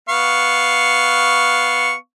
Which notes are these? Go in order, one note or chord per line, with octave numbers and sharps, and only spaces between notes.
B3 F5 C#6